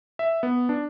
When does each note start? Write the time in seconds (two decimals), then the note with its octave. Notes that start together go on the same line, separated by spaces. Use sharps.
0.19 E5
0.43 B3
0.69 D4